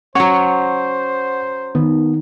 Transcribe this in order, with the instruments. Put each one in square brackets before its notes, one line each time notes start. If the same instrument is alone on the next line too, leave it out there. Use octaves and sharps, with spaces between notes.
[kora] F#3 C#5 [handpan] C#4 [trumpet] C5 [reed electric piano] F#5 C#6
[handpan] D#3 [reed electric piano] B3